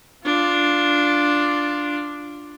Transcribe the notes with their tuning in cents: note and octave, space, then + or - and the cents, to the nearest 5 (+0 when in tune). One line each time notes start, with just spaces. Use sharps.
D4 +0 F4 +0